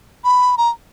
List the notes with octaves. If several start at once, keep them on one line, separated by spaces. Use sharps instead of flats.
B5
A#5